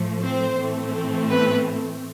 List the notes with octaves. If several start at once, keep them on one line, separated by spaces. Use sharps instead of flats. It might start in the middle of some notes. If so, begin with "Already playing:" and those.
Already playing: A2 F3 A3
C4 C5
A2 E3 A3 C4
B3 B4